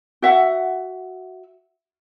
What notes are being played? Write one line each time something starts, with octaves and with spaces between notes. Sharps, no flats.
F#4 E5 F#5